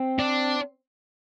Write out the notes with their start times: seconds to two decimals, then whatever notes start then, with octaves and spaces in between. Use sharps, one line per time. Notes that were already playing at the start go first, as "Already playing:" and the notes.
Already playing: C4
0.19 D4